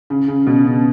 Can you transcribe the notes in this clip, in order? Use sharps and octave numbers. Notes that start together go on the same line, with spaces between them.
C#3
C#3
B2
C#3